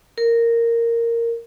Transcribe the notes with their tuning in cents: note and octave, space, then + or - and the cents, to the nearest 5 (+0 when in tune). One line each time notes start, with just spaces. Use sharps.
A#4 -10